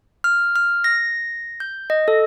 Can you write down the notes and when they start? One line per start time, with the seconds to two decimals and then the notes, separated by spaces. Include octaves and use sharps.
0.24 F6
0.56 F6
0.84 A#6
1.60 G6
1.90 D#5
2.08 A4